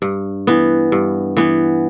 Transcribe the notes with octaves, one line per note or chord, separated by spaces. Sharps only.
G2
E3 B3
G2
E3 B3